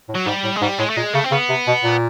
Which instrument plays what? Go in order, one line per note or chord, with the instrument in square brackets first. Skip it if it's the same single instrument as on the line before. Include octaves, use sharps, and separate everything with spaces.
[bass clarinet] A2
[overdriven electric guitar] F#3
[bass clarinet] G#2 [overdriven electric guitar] G3
[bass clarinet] A2
[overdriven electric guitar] G#3
[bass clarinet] G#2 [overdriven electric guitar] G3
[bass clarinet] A2 [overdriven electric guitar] G#3
[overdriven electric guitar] A3
[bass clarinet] A#2 [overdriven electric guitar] G#3
[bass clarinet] C#3 [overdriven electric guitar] A3
[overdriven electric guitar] C4
[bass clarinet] C#3 [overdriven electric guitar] B3
[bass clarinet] C3
B2
A#2